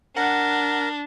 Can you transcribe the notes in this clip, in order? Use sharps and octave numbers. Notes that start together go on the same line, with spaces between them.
D4 A#4 F#5